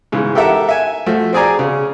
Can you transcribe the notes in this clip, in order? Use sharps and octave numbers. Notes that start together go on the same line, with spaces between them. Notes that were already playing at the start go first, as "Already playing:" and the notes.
G#2 C#3 E3
G4 A4 A#4 E5 F#5
E5 G#5
F3 A3 F#4
C4 F#4 G#4 D5 G#5 A#5
C#3